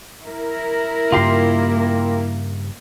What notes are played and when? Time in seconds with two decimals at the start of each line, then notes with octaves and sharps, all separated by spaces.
0.24 E4 A#4
1.12 G2 C#3 A#3 F4 G4 C6